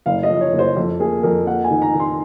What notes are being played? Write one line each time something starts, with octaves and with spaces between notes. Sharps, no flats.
F#1 F5
D#5
F3
C#5
F#1
C5
F2
A#3 G#4
F2 A#4
A#3 F#5
G#5
D#3
A#5
D#3
C6